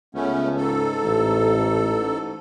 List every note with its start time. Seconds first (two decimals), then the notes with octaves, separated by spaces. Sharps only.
0.15 C#2 A3 B3 C#4
0.57 G#2 A4
1.03 A1